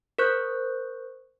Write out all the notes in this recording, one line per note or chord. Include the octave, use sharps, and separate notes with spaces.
A#4 C5 C#6 F#6 G6